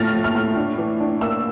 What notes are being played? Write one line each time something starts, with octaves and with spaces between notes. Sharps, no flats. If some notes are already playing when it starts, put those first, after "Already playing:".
Already playing: A2 F3 A3 F6 A6 A#6
F3
F6
A2
D4
E3
D4
A#3 E6